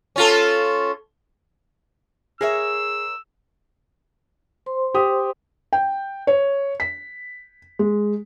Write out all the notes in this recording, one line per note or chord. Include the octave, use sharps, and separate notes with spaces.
C#4 F4 A4
G#4 A#4 C#5 E5 E6
C5 C6
G4 D#6
G5
C#5
B6
G#3